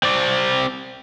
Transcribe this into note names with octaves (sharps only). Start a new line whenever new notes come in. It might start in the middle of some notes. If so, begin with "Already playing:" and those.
C4 D5